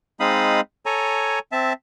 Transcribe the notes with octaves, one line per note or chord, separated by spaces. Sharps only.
G#3 C4 D#4 F5 B5 D#6
A4 C#5 G#5 A#5
C4 E5 A5